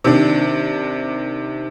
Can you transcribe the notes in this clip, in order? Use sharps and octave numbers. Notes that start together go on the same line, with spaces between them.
C3 D#3 D4